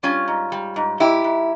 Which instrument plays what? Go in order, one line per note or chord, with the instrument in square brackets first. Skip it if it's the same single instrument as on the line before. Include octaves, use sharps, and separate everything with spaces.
[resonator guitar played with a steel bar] G3 C#4 F4
G#2
G3
G#2
G#2 E4 G4
G#2